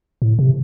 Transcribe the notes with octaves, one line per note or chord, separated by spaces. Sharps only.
A2
C3